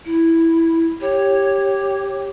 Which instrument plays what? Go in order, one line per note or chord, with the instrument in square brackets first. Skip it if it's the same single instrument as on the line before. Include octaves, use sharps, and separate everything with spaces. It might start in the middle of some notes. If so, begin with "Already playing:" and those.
[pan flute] E4
[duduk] G4 [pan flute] C#5